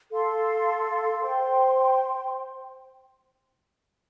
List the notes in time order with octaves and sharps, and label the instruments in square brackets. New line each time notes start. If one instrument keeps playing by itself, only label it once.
[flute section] A4 F5 C6
C5 G5 C6